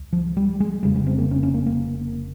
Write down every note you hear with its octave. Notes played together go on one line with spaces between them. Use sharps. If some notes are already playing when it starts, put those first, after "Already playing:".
Already playing: C#2
F3
G3
G#3
F1 F2 C#3 G3
G#3
C4
A#3
C#4
C#4
A#3
A#3